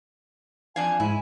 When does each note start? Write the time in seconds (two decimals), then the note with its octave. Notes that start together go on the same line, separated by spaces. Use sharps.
0.76 F2 D4 F5 G#5 G#6
1.00 G#2 E4